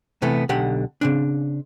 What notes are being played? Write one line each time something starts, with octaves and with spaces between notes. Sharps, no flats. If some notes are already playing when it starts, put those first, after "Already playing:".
C3 E3 A3 B3
B1 D3 G4 F#5
C#3 C4 D4